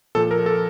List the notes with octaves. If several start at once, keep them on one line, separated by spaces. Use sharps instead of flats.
A#2 F3 A4
A#4
A4